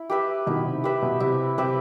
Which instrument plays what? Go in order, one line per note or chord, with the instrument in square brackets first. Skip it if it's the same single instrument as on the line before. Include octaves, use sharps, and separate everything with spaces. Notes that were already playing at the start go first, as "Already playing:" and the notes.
Already playing: [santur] E4
G4 B4 E5
[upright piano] B2 D#3 [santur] E4
[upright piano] C3
[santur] G4 B4 E5
[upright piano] B2
[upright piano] C3 [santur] E4
[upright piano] C3 [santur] G4 B4 E5